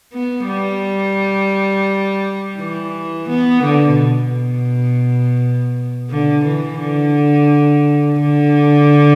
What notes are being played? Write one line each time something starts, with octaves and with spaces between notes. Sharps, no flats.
B3
G3
E3
B3
D3
B2
D3
E3
D3
D3